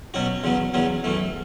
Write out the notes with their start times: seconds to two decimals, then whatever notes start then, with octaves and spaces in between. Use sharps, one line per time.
0.14 B2 F#3 C#4 F#4
0.44 E2 C#3 F#3 B3
0.74 E2 C#3 F#3 B3
1.04 F#2 E3 A3